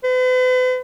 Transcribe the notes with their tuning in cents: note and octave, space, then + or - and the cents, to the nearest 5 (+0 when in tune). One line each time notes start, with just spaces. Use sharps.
B4 +45